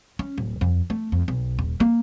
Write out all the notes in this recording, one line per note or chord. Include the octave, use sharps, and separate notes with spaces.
C#4
D1
F2
A3
F2
B1
D#1
A#3